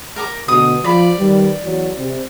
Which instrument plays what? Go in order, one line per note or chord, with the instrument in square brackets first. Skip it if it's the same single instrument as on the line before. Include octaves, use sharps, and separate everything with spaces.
[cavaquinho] A#4 A#5 D6
[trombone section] D2 B2 [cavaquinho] D#6
[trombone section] F3 [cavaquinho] D5 B5
[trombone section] D#3 G3 B4
E2 F#3
C3